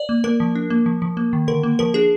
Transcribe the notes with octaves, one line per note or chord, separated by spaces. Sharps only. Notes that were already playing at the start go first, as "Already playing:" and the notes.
Already playing: D5
A#3
A#3 A#4
F3
D4
A#3
F3
F3
A#3
D#3
D3 A#4
A#3
F3 A#4
D4 G#4